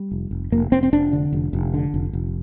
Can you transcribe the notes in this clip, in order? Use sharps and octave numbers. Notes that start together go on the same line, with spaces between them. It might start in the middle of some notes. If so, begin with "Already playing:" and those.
Already playing: G3
F1
F1
F1 A#3
F1 C4
C4
F1 D4
D3
F1
F1
D3
F1
F1